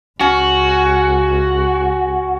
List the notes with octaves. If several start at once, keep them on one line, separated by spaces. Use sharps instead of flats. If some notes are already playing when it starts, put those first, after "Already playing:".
C#2 C#4 F#4